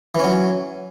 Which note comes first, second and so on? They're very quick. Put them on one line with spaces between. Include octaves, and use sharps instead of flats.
E3 C#4 F#3